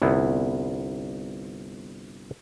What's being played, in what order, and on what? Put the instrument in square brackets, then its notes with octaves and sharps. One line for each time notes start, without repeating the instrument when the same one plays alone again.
[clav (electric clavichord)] G1 C2 B3 E4